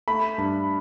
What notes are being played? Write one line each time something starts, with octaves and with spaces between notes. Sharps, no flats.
A3 B5
G2